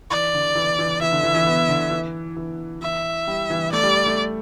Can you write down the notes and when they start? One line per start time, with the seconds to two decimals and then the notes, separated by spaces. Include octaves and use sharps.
0.10 E3 D5
0.34 D3
0.55 E3
0.79 E3
1.01 E3 E5
1.12 D3
1.23 E3
1.34 E3
1.46 B3
1.69 D3
1.91 E3
2.36 E3
2.81 E3 E5
3.28 G3
3.50 E3
3.72 A3 D5
3.83 G3
4.06 A3